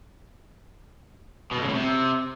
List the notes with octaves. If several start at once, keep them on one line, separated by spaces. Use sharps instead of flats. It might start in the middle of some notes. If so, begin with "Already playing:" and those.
B2
F2
C#3
A2
C3